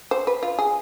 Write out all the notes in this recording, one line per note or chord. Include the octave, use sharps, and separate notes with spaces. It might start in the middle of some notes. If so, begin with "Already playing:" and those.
C5
B4
F4
G#4